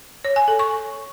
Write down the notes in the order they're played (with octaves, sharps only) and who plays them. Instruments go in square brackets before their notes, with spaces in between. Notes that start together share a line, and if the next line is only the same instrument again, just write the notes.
[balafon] C#5
G#5
A4
C#6